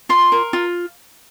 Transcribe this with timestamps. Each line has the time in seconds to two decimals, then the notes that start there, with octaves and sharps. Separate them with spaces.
0.09 F4 C6
0.32 A#4
0.53 F4